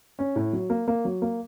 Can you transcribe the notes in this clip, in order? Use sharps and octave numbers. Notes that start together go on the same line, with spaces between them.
C#4
A2
F#3
A#3
A#3
F#3
A#3